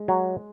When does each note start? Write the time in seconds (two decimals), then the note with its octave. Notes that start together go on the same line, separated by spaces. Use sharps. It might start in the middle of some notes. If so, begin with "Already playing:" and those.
Already playing: G#3
0.08 F#3